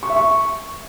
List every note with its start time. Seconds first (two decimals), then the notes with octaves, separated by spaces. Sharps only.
0.03 C#6
0.10 E5
0.17 C#6